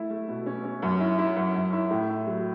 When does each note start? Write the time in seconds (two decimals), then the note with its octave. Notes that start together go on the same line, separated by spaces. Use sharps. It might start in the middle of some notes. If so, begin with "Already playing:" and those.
Already playing: A3 E4
0.10 A3
0.28 B2
0.46 C#4
0.64 C#4
0.82 F#2
1.00 E4
1.18 E4
1.36 F#2
1.54 F#2
1.73 E4
1.90 A2
2.09 E4
2.27 F#3